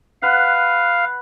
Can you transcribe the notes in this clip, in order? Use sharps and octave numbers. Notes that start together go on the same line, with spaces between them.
B4 F5 F#5